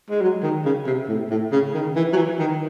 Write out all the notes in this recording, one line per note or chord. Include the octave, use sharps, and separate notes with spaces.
G#3
F#3
D#3
C#3
C3
A2
A2
C#3
D#3
E3
F#3
E3
D#3